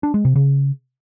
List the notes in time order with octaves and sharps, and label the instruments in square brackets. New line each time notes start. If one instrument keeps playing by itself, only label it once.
[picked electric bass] D4
G#3
C3
C#3